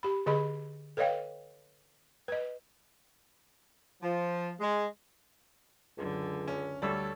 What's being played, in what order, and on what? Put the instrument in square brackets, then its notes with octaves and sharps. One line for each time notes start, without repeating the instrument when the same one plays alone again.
[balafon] G4 B5
D3 G#4 D#5 B5
A4 B4 C#5 D#5 F5 G5
B4 D#5
[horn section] F3
G#3
[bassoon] C#2 [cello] F#2 D3
[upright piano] C#4
[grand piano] D2 G3 E6 [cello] A4 [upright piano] C#5 D5